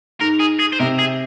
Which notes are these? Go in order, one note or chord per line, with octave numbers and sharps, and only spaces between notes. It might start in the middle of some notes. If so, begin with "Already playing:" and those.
G#2 A#4
G#4
G#4
C5
C3 A#4
G#4